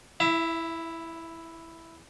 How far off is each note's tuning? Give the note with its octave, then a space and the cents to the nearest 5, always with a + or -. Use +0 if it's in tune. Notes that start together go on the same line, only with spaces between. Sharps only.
E4 +0 E5 +35